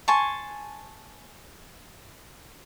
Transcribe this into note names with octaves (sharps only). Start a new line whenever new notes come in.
G#5 A5 C6 C#6